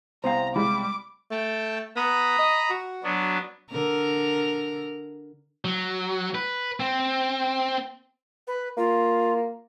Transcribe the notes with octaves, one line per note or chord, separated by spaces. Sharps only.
C2 B3 C5 F5 G5 A#5
G3 G#3 B5 D6
A3 G5 A5
B3 A#5 B5 D#6
D#5
F#4
F#3 B3 D4
D3 A#4
F#3
B4
C4
B4
A#3 F4